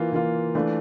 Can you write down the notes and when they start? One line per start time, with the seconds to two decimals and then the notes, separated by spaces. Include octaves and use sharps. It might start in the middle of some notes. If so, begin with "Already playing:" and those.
Already playing: E3 A#3 F4
0.13 E3 A#3 F4
0.55 E3 A3 D4 F4